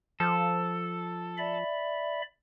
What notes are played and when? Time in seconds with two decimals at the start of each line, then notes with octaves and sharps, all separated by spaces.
0.20 F3 A4
1.38 D5 E5 B5